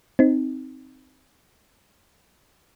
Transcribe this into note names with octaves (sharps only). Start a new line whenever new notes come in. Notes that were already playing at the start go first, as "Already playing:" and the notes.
C4 D#4